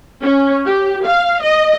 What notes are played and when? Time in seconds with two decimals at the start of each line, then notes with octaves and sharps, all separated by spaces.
0.23 C#4
0.65 G4
1.05 F5
1.43 D#5